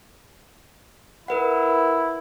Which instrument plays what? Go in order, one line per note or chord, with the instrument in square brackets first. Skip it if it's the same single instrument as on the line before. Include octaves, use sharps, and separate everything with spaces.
[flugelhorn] E4 [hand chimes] A#4 B4 F#5